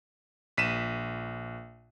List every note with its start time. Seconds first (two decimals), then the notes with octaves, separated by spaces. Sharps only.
0.58 A#1 B6 D#7 E7